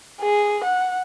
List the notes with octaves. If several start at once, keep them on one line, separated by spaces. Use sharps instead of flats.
G#4
F#5